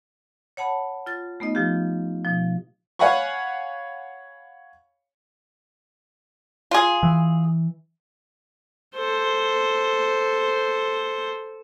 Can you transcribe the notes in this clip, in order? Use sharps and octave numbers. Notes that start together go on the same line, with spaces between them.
C#5 F#5 A5 B5
F4 A6
A3 B3 D#4 D#5
F3 F4 G4
B2 F3
C#5 F5 F#5 G#5 B5 C#6
F4 G#4
E3
A4 C5